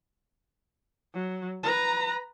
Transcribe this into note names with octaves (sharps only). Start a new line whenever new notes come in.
F#3
B4 A#5